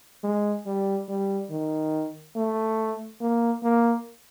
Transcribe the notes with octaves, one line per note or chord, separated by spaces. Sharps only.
G#3
G3
G3
D#3
A3
A#3
A#3